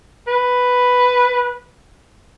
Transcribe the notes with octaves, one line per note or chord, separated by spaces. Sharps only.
B4